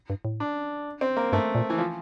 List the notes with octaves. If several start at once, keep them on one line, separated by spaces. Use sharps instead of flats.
G2
A2
D4
C4
A#3
G2 A3
A#2
E3
F3